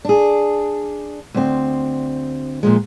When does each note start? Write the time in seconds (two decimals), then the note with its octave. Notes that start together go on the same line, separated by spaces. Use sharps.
0.05 D4 G#4
1.34 D2 C4
2.63 A#2 F3 G#3